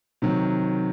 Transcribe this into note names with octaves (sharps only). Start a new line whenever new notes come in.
C3 D#3 F#3